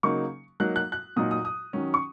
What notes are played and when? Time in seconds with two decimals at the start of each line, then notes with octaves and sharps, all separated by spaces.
0.03 C#3 F#3 A#3 D#4 C#6
0.60 F#3 A#3 D#4 F#6
0.76 F#6
0.92 F#6
1.16 A#2 F#3 D#4 D#6
1.31 D#6
1.45 D#6
1.73 D#3 F#3 C#4
1.94 C#6